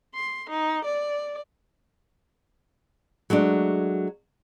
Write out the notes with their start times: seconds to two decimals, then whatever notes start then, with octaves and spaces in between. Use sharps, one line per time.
0.15 C6
0.50 D#4
0.85 D5
3.30 F#3 G#3 A3 D4